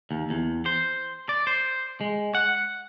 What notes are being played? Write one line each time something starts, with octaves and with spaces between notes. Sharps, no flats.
D#2
E2
C5
D5
C5
G#3
F#5